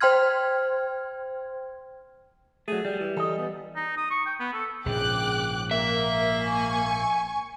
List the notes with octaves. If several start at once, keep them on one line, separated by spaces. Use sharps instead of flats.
C5 G5 C6 F6 G#6
F#3 A3 G#4
G3
E3
E3 A4 D#5
B3
D#4
D#6
C#6
G5
B3
A4
A#1 G#2 C#3 F3 G5 D6 F#6
A#3 A#4 E5
G#5 C#6